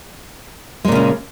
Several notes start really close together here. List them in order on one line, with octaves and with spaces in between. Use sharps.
G#3 A#2 C#3 C#4